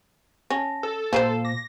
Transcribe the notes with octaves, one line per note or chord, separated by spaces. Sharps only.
C#4 A5 A#6
A4
A#2 F3 B4 C5 A5 C7 E7
D6 A#6